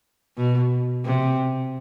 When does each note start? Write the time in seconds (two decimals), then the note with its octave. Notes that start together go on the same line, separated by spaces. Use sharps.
0.37 B2
1.05 C3